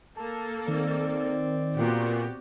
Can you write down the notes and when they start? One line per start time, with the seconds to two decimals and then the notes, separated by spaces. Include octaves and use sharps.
0.17 A#3 A4 A5
0.68 D#3 C4 D5
1.76 A#2 B3 F#4 G4